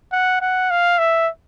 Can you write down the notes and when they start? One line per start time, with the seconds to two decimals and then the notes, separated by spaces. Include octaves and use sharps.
0.12 F#5
0.41 F#5
0.71 F5
0.99 E5